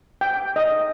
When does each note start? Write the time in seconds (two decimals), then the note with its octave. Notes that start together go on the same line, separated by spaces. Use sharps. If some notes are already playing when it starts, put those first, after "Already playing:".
0.21 G5
0.56 D#5